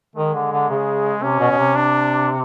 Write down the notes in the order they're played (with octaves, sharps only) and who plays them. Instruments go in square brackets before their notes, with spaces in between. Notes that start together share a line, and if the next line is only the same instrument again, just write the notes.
[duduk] D#3 [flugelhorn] G#3
[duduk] D3
D3
C#3
[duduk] C3 [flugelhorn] C#4
[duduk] B2
B2
C3
[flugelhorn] D4